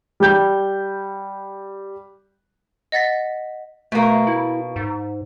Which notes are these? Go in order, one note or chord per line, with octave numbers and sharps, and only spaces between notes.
G3 G6
D#5 F#5 A6 B6
B2 A3 A#3
E4
G#2